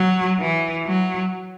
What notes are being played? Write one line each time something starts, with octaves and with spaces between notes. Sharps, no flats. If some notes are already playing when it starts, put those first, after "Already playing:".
Already playing: F#3
E3
F#3